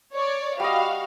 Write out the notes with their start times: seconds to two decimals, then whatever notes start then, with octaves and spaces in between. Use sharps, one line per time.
0.14 C#5 D5
0.60 G3 F#4 D#5 F5